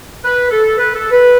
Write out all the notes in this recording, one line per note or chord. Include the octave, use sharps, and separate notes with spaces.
B4
A4
B4
A4
B4